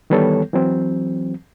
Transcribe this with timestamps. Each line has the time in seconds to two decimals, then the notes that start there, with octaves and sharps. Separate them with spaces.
0.10 D#3 E3 G3 B3 A4 C#5
0.53 E3 F#3 C4